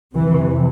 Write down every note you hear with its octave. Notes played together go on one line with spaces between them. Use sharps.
F2 C3 E3